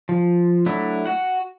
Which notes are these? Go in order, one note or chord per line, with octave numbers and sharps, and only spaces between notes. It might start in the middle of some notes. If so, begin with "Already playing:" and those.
F3
F#3 A3 D4 E4
F#4 F#5